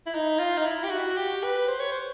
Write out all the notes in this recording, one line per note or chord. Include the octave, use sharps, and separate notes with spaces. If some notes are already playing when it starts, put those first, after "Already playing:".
E4
D#4
F4
D#4
E4
G4
F#4
G4
B4
C5
C#5
C5